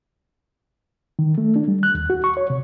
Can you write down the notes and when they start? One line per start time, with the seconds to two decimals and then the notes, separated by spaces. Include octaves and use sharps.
1.19 D#3
1.38 A3
1.56 D4
1.68 G3
1.83 F#6
1.95 D#2
2.10 F#4
2.24 C#6
2.37 C#5
2.50 C3